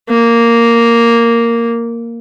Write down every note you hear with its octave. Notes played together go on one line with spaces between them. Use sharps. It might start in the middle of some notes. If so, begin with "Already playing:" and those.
A#3